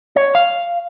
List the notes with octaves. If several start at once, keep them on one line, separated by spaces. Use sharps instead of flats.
C#5
F5